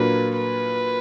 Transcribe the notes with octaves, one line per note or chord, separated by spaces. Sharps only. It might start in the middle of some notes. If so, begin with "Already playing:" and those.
Already playing: A#2 F#3 A#3 D4 B4
B4